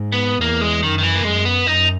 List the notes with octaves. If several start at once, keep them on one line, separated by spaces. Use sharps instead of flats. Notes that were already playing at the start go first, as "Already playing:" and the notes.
Already playing: G#2
B3
E2 A#3
G#3
F#2 D#3
D#3
E3
A#3
F#2 G#3
B3
F#2 D#4